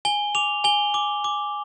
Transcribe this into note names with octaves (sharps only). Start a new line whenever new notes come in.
G#5 G7
D6 F7
G#5 G7
D6
D6